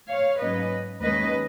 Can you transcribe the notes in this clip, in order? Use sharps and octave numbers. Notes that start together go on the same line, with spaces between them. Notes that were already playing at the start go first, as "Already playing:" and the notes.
C#5 F5
G#2 F#3 A#3 C#4 B4 D#5
D#2 D#3 G#3 C#4 B4 D#5